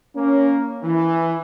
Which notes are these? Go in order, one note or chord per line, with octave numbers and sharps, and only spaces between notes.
A#3 C#4
E3